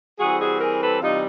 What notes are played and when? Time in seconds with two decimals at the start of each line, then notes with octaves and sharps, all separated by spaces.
0.19 E3 G3 C4 F#4 G#4
0.40 F#4 G#4
0.60 G#4 A#4
0.81 A4 B4
1.01 C3 E3 G3 D#4 F4